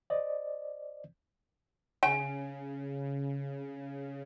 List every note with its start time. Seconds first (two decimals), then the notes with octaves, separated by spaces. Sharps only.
0.10 C5 D5 D#5
2.03 C#3 G#5